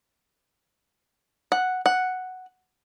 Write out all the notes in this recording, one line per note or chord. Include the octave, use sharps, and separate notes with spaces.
F#5
F#5